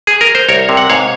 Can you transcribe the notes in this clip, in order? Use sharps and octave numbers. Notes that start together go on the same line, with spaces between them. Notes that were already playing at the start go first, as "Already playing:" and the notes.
G#4
A#4
C5
C2 A#4 C#5
C3
F#5
G#2 C#5 F5